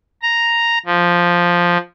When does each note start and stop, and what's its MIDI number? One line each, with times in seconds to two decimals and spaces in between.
0.22 0.78 82
0.86 1.77 53